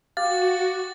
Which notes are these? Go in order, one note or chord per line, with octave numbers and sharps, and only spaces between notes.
F#4 G4 F5 A6